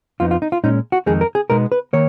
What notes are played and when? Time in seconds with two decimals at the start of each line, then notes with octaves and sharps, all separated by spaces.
0.20 F2 F3 B3 D#4 F4
0.31 F4
0.42 D#4
0.52 F4
0.64 A#2 G#3 C#4 D#4
0.92 F#4
1.06 F2 D#3 G#3 D#4 G#4
1.21 A#4
1.35 G#4
1.50 B2 G#3 B3 D#4 A#4
1.72 B4
1.93 D#3 A#3 C#5